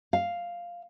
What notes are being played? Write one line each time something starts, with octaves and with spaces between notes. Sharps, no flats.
F5